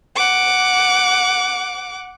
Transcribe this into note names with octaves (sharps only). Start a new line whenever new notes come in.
F#5 D6